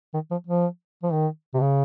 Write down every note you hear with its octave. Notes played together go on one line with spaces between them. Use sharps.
D#3
F3
F3
F3
D#3
C3
C#3